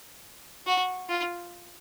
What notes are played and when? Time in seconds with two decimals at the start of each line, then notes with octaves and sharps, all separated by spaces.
0.66 F#4
1.09 F4